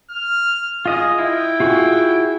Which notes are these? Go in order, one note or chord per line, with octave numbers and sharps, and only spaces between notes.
F6
F4 G#4 D#5 D#6
E4 G5
F4 F#4 G#4